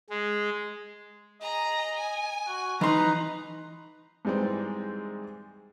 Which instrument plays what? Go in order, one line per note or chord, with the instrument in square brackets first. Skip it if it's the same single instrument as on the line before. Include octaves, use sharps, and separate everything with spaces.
[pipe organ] G#3
[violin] G#4 A#5 [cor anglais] D#5
[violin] G#5
[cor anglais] F#4
[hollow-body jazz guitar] E3 C6 [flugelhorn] D#4 [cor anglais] B4 [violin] A#5
[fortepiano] G#2 E3 G3 G#3 C4